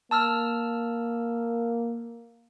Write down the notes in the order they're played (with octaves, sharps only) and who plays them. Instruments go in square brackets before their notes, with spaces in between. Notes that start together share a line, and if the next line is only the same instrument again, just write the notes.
[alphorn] A#3 [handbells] A5 E6 F6